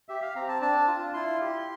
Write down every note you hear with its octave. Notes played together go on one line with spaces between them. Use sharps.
G4 E5
F5
C4 A#5
A5
D4 A5
F4
E4 C6
G4